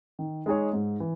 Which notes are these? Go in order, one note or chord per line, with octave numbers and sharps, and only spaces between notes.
D#3
G#3 D#4 G#4 C#5
G#2
E3